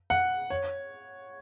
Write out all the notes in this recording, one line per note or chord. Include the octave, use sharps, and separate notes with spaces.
F#5
C#5